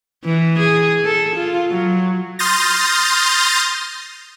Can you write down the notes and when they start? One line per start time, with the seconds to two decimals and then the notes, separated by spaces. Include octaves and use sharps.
0.25 E3
0.60 G#4
1.04 A4
1.37 F4
1.71 F#3
2.39 C6 D#6 F6 G6 A6 A#6